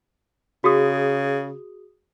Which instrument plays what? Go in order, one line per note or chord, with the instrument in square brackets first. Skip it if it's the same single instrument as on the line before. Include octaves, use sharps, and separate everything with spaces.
[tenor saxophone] C#3 [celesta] F#4 G#4 D#6